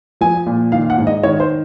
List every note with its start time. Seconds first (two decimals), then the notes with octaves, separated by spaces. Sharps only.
0.21 F3 G#5
0.46 A#2
0.72 D#3 F5
0.90 F#5
0.98 G#2
1.07 D#5
1.23 D#3 C#5
1.40 C5